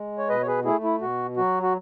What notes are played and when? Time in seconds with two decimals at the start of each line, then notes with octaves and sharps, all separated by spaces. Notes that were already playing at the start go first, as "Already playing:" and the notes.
Already playing: G#3
0.18 C#5
0.29 B2 B4 D#5
0.42 C#5
0.47 G#4 B4
0.65 A3 E4 G#4
0.84 E4
1.01 B2 F#4
1.37 F#3 F#4
1.63 F#4